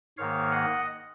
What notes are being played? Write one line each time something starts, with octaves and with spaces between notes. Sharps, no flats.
G#2 D#3 A#3 C#5 F5
D#5 F#5